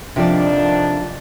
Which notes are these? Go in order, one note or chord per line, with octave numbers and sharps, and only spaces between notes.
F2 C3 D#3 F3 D4 D5